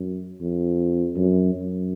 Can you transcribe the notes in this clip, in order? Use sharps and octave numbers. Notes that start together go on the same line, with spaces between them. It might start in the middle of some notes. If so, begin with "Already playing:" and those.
Already playing: F#2
F2
F#2
F#2